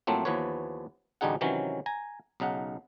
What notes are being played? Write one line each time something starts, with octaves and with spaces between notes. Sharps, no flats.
A2 F3 F#3 A3 A#3 C4
D#2 E3 F3 B3 B4 C#5
A1 D2 G3 D#4 G#4 F#5
C3 D#3 E3 F#3 C#4
G#5 A#5
B1 C#3 D#4 F#5